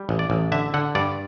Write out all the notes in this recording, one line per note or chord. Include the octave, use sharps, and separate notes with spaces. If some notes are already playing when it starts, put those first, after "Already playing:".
Already playing: G3
A1
D5
A1
D3 E5
D3 F#5
G2 D5